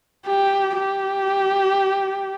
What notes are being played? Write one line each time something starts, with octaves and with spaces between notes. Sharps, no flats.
G4
G4